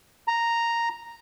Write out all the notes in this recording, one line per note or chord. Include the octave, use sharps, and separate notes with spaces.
A#5